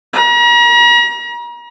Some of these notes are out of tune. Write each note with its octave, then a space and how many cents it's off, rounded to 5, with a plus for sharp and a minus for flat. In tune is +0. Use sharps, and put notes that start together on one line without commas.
A#5 +40